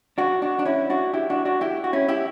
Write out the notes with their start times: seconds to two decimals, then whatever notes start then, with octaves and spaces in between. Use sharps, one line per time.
0.18 D4 F#4
0.42 D4 F#4
0.59 D4
0.65 C#4 E4
0.90 D4 F#4
1.14 E4 G4
1.30 D4 F#4
1.45 D4 F#4
1.61 E4 G4
1.84 F#4
1.93 C#4 E4
2.08 E4 G4